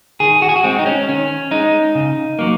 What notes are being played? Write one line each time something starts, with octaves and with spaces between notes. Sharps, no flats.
D#3 G#4
F#4
G#4
F#4
G#3 C4
D#4
C#4
D#3 C#4
G#3 D#4
C#3
F#3 A#3